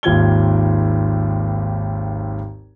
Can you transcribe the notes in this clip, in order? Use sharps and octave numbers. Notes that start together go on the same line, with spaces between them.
G#1 D#2 F4 G#6 G7